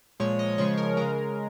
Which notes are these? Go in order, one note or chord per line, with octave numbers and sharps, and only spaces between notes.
A#2 F3 G#3 C#5
D#5
C#3 F3 G#3 C#5
A#4
C#3 G#3 A#4